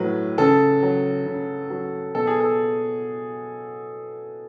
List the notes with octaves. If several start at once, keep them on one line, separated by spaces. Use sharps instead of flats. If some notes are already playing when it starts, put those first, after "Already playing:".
Already playing: A2 F#3 B4
C#3 A4
F#3
C#3
F#3
B2 A4
G#4
A4